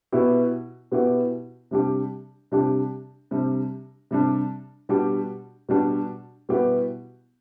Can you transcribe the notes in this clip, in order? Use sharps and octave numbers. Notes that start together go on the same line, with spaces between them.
B2 B3 E4 G4
B2 B3 E4 G4
C3 G3 D4 G4
C3 G3 D4 G4
C3 G3 D4
C3 G3 D4
B2 G3 D4 G4
B2 G3 D4 G4
B2 G3 B3 E4 G4